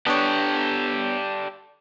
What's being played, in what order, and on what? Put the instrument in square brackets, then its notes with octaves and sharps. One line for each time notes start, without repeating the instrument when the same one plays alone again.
[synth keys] B3 D4 C#5 [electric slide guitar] G4 A4 D5